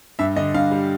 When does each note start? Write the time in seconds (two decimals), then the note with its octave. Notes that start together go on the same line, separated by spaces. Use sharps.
0.19 G2 E5
0.36 D3 D#5
0.54 G2 F5
0.72 G3